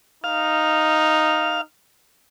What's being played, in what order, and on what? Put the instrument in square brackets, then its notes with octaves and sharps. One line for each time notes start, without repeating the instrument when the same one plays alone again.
[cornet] D#4 [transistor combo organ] F5